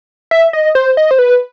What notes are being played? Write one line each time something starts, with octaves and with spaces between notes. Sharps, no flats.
E5
D#5
C5
D#5
C5
B4